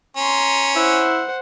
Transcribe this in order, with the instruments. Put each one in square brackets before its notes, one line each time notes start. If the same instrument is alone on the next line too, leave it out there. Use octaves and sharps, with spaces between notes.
[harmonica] C#4 [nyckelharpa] A#5 C6
[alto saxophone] E4 [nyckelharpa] C5 F#5